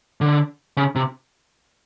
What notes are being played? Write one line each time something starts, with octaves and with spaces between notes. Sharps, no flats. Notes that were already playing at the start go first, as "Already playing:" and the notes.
D3
C#3
C3